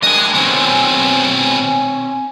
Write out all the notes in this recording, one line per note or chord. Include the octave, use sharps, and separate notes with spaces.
G3 D4 A#4 D#5 G#5
B2 D#3 C4 C#4 C5